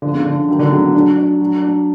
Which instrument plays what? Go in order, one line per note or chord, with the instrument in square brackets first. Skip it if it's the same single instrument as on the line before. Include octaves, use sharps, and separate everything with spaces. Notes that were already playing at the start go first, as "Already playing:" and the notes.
[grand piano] D3 [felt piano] F3
[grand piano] C#3
[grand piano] D3 [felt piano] D4
[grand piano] D#3 [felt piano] F#3
[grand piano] D3
[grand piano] C#3 [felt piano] F#3
[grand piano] C#3
[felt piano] D4
D4
F#3
D4